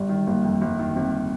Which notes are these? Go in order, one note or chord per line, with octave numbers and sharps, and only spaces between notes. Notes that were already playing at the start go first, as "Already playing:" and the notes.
Already playing: G1 G3
D#3
G1 A#3
F2
G1
D#3
G1 C4